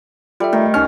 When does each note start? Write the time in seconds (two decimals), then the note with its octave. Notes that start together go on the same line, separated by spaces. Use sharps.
0.40 G3 F4 A4 E5
0.53 D#3 A3
0.74 C2 C#4 D#4 F6